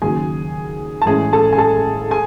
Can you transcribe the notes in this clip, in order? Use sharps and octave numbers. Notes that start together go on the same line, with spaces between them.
D#2 C#3 F#3 G#4 G#5
A5
A1 A2 G#3 C#4 E4 G#4 G#5
A4 A5
G#5
A4 A5
G#4 G#5